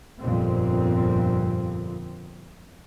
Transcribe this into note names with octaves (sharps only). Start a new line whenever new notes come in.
G1 F2 A#2 C4